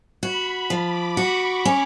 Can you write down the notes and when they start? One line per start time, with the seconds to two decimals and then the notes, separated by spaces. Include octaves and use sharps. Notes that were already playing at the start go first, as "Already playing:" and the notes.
0.23 F#4 B5
0.70 F3
0.86 D6
1.17 F#4 C#6
1.65 C#4